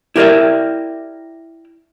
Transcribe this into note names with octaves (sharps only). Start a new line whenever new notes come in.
E4 G4 A#4 C5 D5 E5